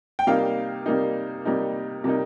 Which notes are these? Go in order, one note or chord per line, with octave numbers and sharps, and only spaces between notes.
G5
C3 G3 A#3 D#4 F5
C3 G3 A#3 D#4
C3 G3 A#3 D#4
C3 G3 A#3 D#4